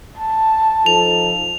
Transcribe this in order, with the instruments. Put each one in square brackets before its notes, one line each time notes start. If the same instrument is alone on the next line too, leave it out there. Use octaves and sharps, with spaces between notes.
[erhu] A5
[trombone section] F3 D#4 A4 [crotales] F7